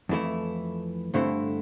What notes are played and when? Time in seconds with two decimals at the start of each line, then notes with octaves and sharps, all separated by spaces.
0.09 F2 E3 A3 E4
1.14 G2 D3 A3 C4 E4